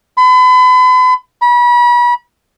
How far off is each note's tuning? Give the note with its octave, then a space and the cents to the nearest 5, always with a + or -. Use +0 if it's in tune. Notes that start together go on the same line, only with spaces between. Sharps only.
B5 +40
B5 -35